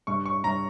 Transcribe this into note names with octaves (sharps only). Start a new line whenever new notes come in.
G2 C#6
C#6
G2 A#5